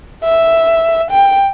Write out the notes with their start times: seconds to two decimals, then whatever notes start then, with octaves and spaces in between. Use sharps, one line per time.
0.24 E5
1.11 G5